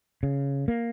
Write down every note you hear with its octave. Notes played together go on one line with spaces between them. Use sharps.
C#3
A#3